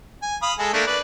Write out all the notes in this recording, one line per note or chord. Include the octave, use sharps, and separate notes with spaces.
G#5
F5 B5 D#6
G#3 G#4 A4
A3 A#3 D4
B4 D5